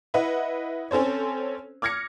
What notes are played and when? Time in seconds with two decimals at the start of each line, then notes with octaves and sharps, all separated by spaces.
0.14 E4 B4 D#5 F#5
0.91 C4 C#4 A4 C5 C#5
1.82 D6 F6 G#6 A#6 C#7